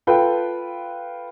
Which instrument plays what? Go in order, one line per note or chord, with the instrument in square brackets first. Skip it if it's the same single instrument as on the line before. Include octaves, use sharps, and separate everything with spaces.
[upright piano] F4 A4 B4 G5